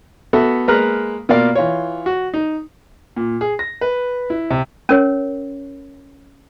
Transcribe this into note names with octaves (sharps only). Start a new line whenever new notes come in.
A3 B3 F#4 A4 E5
G#3 A#3 B4 A#5 F6 F#6
B2 A#3 F4 D5 F5
E3 F4 C#5
F#4
D#4
A#2
G#4
A#6
B4
E4
C3
C#4 A#4 C#5